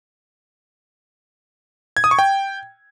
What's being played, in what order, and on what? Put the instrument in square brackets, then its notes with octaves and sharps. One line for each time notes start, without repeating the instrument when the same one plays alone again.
[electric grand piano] G#6
D#6
C#6
G5